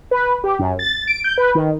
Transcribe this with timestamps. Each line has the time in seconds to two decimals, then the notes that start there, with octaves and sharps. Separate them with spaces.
0.11 B4
0.44 G4
0.59 F#2
0.79 A6
1.08 D7
1.24 G6
1.38 B4
1.55 D#3